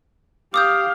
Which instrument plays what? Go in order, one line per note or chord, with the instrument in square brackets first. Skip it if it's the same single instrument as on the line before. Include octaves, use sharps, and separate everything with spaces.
[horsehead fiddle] G4 F5 [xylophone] D6 D#6 G6